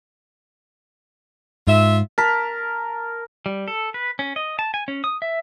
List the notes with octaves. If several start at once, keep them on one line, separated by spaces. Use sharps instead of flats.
G#2 F4 E5
A#4 A5 B6
G3
A4
B4
C#4
D#5
A5
G#5
C#4
D#6
E5